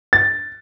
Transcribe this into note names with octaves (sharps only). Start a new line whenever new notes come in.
A6